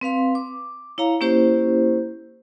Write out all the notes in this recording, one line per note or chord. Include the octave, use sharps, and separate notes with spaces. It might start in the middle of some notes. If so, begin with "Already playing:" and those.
C4 B4 F5 C6
D6
E4 C#5 F5 A#5
A#3 C#4 E4 G4 C5